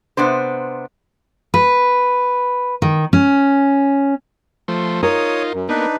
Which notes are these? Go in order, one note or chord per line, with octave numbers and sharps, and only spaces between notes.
C3 B3 D4 C5
B4
D#3
C#4
F3 A3 C5
D#4 F4 A#4 C#5 D#6
F#2
A#3 B3 D4 D#4 B4